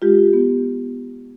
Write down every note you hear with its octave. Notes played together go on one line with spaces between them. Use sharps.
G#3 F4 G4
B3